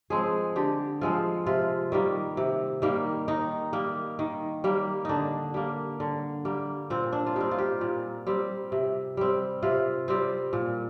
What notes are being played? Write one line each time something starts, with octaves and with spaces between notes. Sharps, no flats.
F3 G#3 C4 G#4
D3 G4
F3 G#3 C4 F4
C3 F4
D#3 G3 A#3
C3
D#3 G3 A#3
D#3 D#4
G3 A#3
D#3
G3 A#3
D3 D4 D#4
G3 A#3
D3
G3 A#3
A#2 C4
D4
F4
G3 C4 D#4
F4
G4
A#2
G3 C4
C3
G3 C4
C3 F4
G3 C4
A#2